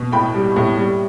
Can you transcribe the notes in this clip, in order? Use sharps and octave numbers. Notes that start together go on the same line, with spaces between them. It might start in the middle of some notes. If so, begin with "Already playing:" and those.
Already playing: B2
A2 G5 B5
G3
A2
G3